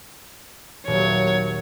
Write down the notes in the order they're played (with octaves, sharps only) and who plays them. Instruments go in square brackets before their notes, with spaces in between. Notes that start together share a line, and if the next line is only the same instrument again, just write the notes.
[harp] D#1 [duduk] F#3 [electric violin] C#5